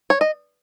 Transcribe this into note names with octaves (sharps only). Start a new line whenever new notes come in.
C#5
D#5